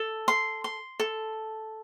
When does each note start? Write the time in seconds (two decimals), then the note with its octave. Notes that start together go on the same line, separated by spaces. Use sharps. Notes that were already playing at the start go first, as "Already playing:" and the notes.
Already playing: A4
0.28 C6
0.64 C6
1.00 A4